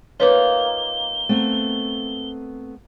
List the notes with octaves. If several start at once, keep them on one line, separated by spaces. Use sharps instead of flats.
A#3 D#4 F4 B4 C#5 G7
A3 B3 C4